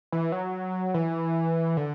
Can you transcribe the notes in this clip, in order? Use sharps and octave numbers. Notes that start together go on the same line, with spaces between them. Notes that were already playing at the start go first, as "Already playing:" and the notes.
E3
F#3
E3
D3